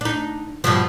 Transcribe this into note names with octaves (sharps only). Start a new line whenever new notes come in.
D4 D#4
G2 B2 F3